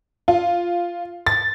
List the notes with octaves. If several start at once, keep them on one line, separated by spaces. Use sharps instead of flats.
F4
A6